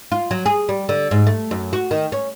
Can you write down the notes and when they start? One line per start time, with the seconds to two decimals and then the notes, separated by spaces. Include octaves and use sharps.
0.12 F4
0.31 F#3
0.46 G#4
0.69 G3
0.89 D3
1.11 G#2
1.27 A3
1.51 F#2
1.73 F#4
1.91 D#3
2.12 C#4